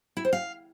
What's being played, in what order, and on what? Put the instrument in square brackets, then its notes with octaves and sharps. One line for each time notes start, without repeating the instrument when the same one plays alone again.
[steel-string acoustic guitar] E4
C5
F5